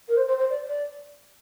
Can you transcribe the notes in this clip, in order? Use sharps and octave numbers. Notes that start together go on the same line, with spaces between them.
A#4
C5
C5
C5
D5
D5